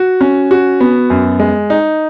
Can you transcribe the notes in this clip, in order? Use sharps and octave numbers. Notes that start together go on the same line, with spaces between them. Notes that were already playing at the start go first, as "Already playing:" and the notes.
Already playing: F#4
C#4
F#4
B3
F#2
G#3
D#4